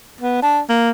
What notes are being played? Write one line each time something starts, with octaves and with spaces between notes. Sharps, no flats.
B3
D4
A#3